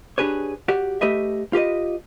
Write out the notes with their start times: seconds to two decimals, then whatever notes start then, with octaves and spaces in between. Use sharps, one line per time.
0.18 D4 G4 G#4 B4 C#5
0.68 F#4 G4 D5
1.01 A3 G4 B4 D#5 E5
1.53 F4 G4 B4 D#5